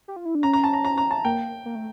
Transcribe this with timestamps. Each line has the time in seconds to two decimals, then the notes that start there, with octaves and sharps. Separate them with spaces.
0.08 G4
0.16 F4
0.25 E4
0.35 D4
0.43 C#4 A#5
0.53 A#5
0.64 A5
0.73 A#5
0.85 A#5
0.98 A#5
1.11 A5
1.25 A#3 G5
1.65 A#3
1.75 A3